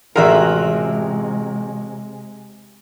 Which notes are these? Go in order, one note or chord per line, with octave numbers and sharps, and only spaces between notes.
A1 C3 G#3 F4 F#4 G#4 A#4 E5